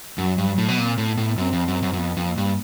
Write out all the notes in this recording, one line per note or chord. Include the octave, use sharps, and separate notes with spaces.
F#2 F#3
G2
F#3
A2
B2
A#2 C4
A2
B3
A2
F#2 C4
F2
F#2
F#2
F#2
F2 B3
F2
A#3
G2